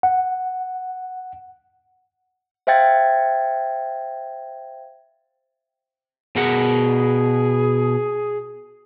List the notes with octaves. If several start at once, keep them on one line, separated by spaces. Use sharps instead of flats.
F#5
C5 E5 F5 G5 G#6 A6
B2 G#4 A#4 F#5